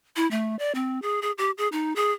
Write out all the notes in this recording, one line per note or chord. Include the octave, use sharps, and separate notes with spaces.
E4
A3
D5
C4
G#4
G#4
G4
G#4
D#4
G#4